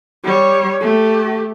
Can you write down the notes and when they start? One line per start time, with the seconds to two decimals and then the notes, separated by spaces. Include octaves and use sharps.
0.24 G3 C#5
0.81 A3 G4